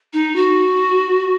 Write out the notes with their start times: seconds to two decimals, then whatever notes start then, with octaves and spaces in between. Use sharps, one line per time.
0.13 D#4
0.36 F#4